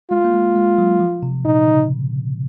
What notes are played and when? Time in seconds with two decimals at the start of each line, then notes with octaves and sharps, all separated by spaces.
0.11 G#3 F4
0.24 A#3
0.34 G#3
0.56 G#3
0.78 F#3
1.00 F3
1.23 C3
1.45 A#2 D#4
1.68 C#3